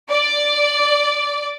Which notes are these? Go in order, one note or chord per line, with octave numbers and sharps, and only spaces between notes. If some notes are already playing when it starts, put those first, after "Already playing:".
D5